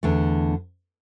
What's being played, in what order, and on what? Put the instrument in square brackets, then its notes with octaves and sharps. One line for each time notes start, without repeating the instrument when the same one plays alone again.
[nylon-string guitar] E2 D3 A3